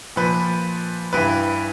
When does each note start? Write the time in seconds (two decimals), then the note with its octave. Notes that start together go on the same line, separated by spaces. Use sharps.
0.16 A#2 F3 B4
1.13 G2 E3 B4